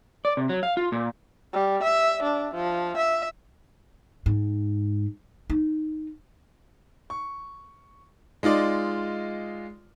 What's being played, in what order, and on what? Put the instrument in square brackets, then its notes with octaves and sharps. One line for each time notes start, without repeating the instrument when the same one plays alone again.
[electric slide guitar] D5
C3
F#3
F5
F4
A#2
[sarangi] G3
E5
D4
F3
E5
[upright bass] G#2
D#4
[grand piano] C#6
G#3 D#4 F4 D5